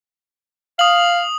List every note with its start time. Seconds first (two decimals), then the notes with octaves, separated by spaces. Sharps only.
0.79 F5 D#6 F#7